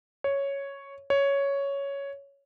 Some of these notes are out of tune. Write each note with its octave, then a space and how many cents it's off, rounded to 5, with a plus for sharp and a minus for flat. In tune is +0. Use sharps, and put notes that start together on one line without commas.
C#5 +0
C#5 +5